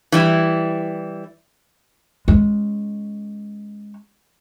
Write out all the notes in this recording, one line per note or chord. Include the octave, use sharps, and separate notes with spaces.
E3 G3 E4
G#3 C#4